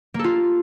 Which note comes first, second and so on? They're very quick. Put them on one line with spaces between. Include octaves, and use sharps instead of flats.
A#3 A4 F4